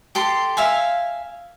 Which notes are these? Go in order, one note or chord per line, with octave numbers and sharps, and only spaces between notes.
G4 A4 C6
E5 F5 G#5